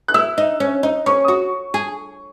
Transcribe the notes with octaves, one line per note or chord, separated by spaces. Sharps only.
F#6
E4 E6
D#4
C#4
D#4
C#4 C#6
D#6
F#4 C#6
G#4